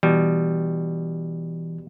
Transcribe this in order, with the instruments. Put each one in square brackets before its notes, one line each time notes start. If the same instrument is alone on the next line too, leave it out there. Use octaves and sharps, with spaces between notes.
[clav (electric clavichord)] B2 G3 [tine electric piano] E3